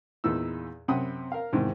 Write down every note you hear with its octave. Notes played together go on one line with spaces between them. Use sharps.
E2 A#2 B3 D#4 E6
F#2 C3 F#5 G5 B5 D#6
A#4 F5
E2 G#2 C3 D#3